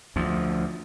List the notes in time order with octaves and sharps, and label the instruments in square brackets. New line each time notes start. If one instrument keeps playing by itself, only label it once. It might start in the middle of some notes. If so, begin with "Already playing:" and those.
[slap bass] D2 F3